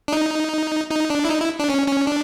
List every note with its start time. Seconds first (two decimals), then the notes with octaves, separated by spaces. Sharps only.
0.08 D4
0.12 D#4
0.91 D#4
1.10 D4
1.25 E4
1.30 D#4
1.40 E4
1.59 D4
1.69 C#4
1.88 C#4
2.07 D4